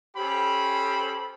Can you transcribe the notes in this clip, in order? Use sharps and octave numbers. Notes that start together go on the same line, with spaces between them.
C#4 G4 A4 C5 B5